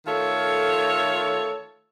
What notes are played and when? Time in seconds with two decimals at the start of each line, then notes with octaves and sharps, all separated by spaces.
0.06 D#3 A3 F4 A4 C#5